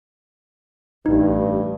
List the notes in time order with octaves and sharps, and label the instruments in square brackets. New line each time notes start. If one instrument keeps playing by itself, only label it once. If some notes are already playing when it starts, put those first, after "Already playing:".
[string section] A1 [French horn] G2 [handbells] D#4